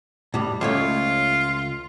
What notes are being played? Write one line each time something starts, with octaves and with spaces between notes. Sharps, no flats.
A2 G3
C#2 A3 F4 C#5